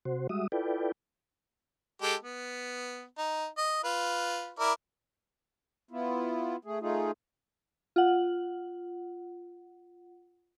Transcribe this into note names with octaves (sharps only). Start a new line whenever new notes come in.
C3 F#4 C5
G3 G#3 F#4 E5 D#6
E4 F4 A4 B4 D5 G5
G#3 G4 A4
B3
D#4
D#5
F4 B4
E4 A#4 D5
B3 E4 F4
A3 G#4
A3 D#4 F4 G#4
F4 F#5